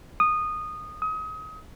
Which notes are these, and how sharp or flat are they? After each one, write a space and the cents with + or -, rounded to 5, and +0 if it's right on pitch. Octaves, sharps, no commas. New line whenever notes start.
D#6 -15
D#6 +30